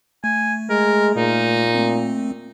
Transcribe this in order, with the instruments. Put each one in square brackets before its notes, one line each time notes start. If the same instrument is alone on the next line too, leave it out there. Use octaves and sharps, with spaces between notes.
[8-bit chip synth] A3 [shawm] G#5
[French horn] G#3 [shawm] A#4
[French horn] A#2 [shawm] D#4
[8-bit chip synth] A3 C4